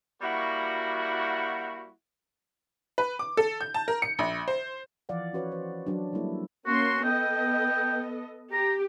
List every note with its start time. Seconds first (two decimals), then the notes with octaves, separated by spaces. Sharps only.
0.21 G3 A#3 E4 F#4
2.98 B4
3.19 D6
3.37 A4
3.61 G6
3.74 A5
3.88 A#4
4.02 C#7
4.19 A#1
4.48 C5
5.09 E3 F3 D5 F5 F#5
5.33 C#4 F#4 B4 C#5
5.52 C5
5.86 F#3 D4
6.13 G3 G#3 A#3 E4 A4
6.66 A#3 C#4 F#4 C6
7.04 B3 A4 D#5 G5
8.52 G4 A#5